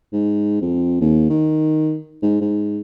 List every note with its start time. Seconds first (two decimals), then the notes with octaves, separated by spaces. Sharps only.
0.13 G#2
0.62 F2
1.01 D#2
1.30 D#3
2.23 G#2
2.41 G#2